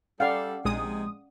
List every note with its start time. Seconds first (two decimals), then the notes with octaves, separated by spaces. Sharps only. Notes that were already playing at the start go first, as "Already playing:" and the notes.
0.20 G3 C#4 A4 D5 F5 F#5 D6
0.65 A#1 C3 G#3 D#4 G#4 D#6